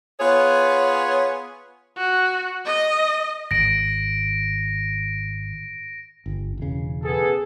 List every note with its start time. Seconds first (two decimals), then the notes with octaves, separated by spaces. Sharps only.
0.20 B3 F4 G#4 C#5
1.97 F#4
2.65 D#5
3.51 G#1 A#6 D7
6.26 G1
6.58 E1 C#3
7.04 B3 G#4 A4